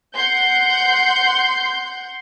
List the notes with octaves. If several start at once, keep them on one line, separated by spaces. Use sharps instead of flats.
F#5 C6 G6